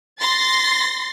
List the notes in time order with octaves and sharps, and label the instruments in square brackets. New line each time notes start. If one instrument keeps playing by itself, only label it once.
[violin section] C6 A6 A#6 C7